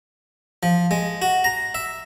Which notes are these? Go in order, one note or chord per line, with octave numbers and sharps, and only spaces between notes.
F3
G#3
F#4
A#5
E5